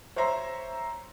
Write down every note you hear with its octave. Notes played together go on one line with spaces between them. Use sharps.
C5 C#5 E5 A#5 C6